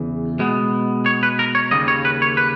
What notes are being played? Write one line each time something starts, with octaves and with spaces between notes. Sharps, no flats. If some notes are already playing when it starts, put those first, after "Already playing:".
Already playing: E2 C#3 E3
B2 G#3 B3
C#5
B4
A#4
C#5
D#2 C#3 G3 A#3 D#5
C#5
B4
C#5
B4